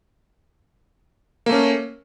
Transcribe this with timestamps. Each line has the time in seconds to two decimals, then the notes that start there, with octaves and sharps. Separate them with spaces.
1.46 A#3
1.49 A3
1.52 C#4